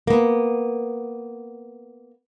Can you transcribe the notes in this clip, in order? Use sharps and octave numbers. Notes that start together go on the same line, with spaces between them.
A#3 B3